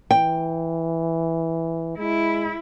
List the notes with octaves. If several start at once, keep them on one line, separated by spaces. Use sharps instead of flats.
E3 G5
G#3 E4